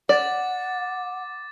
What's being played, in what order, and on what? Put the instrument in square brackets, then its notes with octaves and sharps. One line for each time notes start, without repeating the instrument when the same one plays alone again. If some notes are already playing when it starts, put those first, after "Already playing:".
[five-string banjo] D5 [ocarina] F#5 [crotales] D6 A6